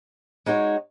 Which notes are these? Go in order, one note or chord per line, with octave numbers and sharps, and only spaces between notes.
G#3 D#4 F#4 C#5